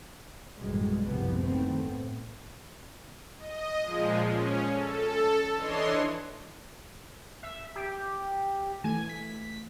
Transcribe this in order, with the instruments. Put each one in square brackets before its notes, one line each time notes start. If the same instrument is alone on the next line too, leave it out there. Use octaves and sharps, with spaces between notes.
[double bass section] A1 F#2 B2 E3 G3 G#3
F#1 C2 C3 F3 B3
D#3 A3 B3 C4
A2
[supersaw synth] D#5
A#2 F3 G#3
C#4
A4
E3 D4 C#5 D#5 C6
[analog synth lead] E5
G4
[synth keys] E3 A3 [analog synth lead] G#5
[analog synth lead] B6